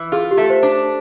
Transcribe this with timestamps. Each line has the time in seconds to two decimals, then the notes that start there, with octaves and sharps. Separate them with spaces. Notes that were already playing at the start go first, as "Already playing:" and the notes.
Already playing: E3
0.12 F4 G#4
0.31 G4
0.37 A3
0.50 C5
0.63 D4